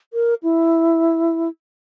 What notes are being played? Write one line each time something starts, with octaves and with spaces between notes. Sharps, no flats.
A#4
E4